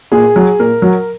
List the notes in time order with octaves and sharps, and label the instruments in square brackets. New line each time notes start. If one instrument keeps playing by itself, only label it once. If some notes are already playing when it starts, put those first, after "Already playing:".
[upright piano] A#2 G#4
F#3
A#2 A#4
F#3